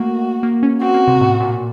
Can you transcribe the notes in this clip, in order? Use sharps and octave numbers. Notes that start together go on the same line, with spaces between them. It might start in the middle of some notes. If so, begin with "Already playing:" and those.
Already playing: A3 A#3 F#4
A#3
C#4
C4 F#4
A#3
C3
A2
A#2